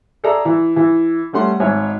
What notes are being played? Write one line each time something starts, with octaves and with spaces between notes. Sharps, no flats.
G#4 A4 D5 E5 A#5
E3
E3
G3 A3 C#4 F#5 C6
G#1 G#2 C#5 E5 G#5